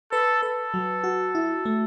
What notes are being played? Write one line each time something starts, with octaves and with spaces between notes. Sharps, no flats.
A4 B4
A4 B4
F#3
F#4
E4
A3